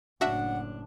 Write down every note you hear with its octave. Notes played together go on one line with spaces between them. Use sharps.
F#1 A2 D4 F#4 E5 F#5